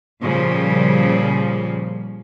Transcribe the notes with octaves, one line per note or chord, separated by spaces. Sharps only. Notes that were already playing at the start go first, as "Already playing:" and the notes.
A#2 C#3 F3 G3